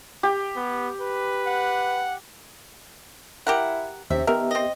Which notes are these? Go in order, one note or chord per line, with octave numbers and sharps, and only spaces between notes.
G4
B3
B4
F#5
E4 G4 A#4 F#5
D#2 C3 C#4 E5
D#3 B3 G4 A#4 E5
C4 D#5